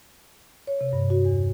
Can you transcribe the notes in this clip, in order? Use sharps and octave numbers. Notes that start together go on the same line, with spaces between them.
C#5
C3
G2
F#4
E2